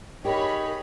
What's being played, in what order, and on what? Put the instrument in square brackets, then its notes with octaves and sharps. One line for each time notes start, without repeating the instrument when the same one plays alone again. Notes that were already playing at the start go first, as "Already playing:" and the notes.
[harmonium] D#4 D#5 [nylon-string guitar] G4 [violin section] G#4 C#5 B5 [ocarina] A#4